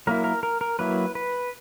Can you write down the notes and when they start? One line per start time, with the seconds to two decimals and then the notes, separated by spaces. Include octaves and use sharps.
0.07 F#3 A#3 E4 A#4
0.24 A#4
0.43 A#4
0.61 A#4
0.79 F#3 A#3 E4 B4
1.15 B4